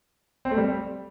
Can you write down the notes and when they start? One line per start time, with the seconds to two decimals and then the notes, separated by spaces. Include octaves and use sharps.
0.45 C4
0.51 A3
0.58 G3